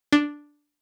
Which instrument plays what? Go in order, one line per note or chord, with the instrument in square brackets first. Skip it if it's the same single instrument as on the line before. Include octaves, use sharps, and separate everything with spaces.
[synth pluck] D4